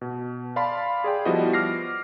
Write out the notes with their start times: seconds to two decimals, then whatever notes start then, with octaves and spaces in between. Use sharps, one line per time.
0.01 B2
0.56 D5 F5 A5 B5 C6
1.04 G#4 D5 G5
1.25 F3 G3 B3 E4 F#4 D#5
1.53 D6 F6 A#6 C7